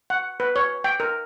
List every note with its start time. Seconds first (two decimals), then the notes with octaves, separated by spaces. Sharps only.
0.10 F#5
0.40 B4
0.56 C#5
0.84 G5
1.00 A#4